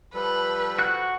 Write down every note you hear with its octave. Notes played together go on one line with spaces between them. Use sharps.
F3 G3 A4 B4
F#4 F#6